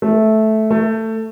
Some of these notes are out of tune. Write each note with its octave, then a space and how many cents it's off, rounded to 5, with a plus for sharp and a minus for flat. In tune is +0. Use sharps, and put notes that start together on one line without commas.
A3 -10
A3 +15